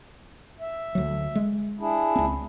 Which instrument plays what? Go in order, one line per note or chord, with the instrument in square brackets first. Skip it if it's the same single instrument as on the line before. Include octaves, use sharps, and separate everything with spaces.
[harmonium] E5
[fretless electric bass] D2 F#3
G#3
[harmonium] D4 E4 G#4
[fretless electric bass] C#2 C4